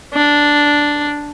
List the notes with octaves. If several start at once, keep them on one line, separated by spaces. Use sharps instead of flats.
D4